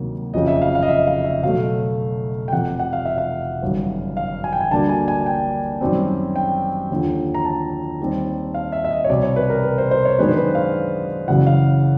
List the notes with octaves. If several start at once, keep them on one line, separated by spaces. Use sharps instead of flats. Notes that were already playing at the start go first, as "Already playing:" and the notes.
Already playing: D2 C3 D#3 F#3 A#3
F#1 F2 C#3 D#5
E5
F5
F5
D#5
E5
F5
E5
B1 B2 F#3 A3 F5
G5
F1 F2 C3 F#5
F#5
F5
E5
F5
G1 F#2 D#3 G3
F5
G#5
G5
G#5
D2 D3 G3 A#3 D4 A5
G#5
G#5
G5
F#2 D#3 G3 C4
G5
D#2 D3 F3
A#5
A5
D#2 D#3 G3 C4
F5
E5
E5
D#5
C#5
C2 B2 G3 C4 D5
C#5
B4
A#4
B4
C5
C5
C#5
F#2 D#3 G#3 B3 D4 B4
C5
B4
F5
F#1 F#2 C#3 E3 F#5
F5